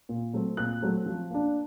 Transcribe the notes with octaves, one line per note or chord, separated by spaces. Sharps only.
A#2
F#3 A3 C4
A#2 F#6
F#3 A3 C4
F3
A#3 D4